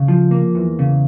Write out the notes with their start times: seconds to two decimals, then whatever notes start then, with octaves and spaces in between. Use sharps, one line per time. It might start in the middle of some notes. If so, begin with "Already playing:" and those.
Already playing: C#3
0.08 F3
0.31 A#3
0.55 E2
0.79 C#3